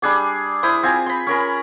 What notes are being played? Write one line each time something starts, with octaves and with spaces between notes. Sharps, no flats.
G3 D4 G#4 D6
E4 C5 D#6
C4 F4 G#5
B5 C6
C#4 A#4 B5